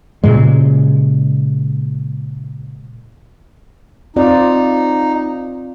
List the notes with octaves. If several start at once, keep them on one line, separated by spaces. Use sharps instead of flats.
A#2 C#3 G#3
C4 D#4 F4 D5